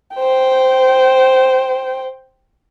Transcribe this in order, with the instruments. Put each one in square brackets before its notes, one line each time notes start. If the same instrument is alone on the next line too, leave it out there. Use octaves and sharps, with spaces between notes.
[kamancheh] C5 G5